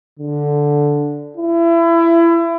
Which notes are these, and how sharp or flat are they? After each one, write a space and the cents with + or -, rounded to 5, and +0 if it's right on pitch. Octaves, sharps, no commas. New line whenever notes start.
D3 -5
E4 +30